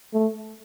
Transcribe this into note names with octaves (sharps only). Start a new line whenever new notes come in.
A3